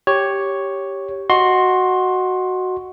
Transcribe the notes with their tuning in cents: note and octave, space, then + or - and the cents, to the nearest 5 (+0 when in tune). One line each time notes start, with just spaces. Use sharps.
G4 +0 C#5 +0
F#4 +0 D#5 +0 C6 +15